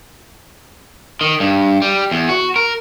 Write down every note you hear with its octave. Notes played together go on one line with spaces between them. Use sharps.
D#3
G2
G3
E2
F#4
A#4